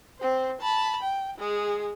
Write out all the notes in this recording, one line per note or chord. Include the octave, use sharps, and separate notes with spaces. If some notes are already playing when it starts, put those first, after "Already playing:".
C4 C5
A5 B5
G5
G#3 G#4